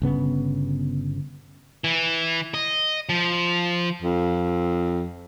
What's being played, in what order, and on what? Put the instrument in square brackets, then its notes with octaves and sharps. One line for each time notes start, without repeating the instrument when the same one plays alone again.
[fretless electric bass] G1 C#3 B3
[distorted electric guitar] E3
D#5
F3
[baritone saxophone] F2